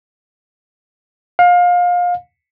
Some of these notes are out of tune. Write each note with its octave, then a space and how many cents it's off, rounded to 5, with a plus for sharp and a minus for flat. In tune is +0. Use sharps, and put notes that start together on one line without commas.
F5 +25